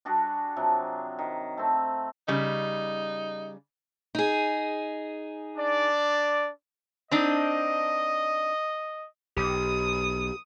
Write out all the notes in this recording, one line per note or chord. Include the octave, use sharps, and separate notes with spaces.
G3 D4 F#4 G#4
C3 F3 F#3
D#3
A3 C4
C#3 G3 D#4
D#4 G#4
D4 D5
C4 D4 D#4 D#5
B1 G4 D#6